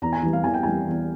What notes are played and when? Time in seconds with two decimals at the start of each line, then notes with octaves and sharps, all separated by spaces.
0.02 E2 A#5
0.13 G#5
0.23 E3 G3
0.33 F5
0.44 E2 G#5
0.54 G5
0.63 E3 G3 G#5
0.88 E2